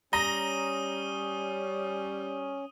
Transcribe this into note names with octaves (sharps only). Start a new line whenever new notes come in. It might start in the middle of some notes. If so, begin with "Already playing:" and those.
G3 C#4 A#5 D#6 A#6 D#7 G7